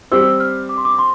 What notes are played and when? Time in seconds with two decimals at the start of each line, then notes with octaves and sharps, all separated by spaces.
0.11 G3 C4 G4 C5 E6
0.40 F6
0.69 D6
0.78 C6
0.85 D6
0.99 C6